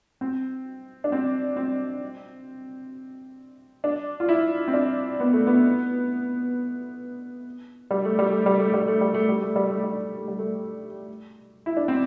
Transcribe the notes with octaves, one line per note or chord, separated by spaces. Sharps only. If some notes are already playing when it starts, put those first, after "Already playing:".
C4
D4
C4
C4
D4
F4
E4
C4
D4
B3
A3
B3
G3
A3
G3
A3
G3
A3
G3
A3
G3
A3
G3
A3
G3
A3
G3
A3
G3
A3
E4
D4
C4